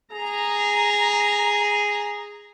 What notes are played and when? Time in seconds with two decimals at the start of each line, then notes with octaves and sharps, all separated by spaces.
0.13 G#4 A#5